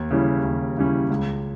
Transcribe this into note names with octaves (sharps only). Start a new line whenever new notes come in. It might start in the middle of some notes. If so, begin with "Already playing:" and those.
Already playing: D#2
C#3 E3 G3 C#4
D#2
C#3 E3 G3 C#4
C#2